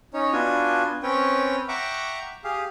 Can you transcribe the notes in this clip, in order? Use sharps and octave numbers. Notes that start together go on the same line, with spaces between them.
C#4 D#4 C#5
B3 D4 F4 F#4 G#5
C4 C#4 B4 C#5 G5
E5 F#5 G5 A#5 C#6 D6
G4 G#4 F5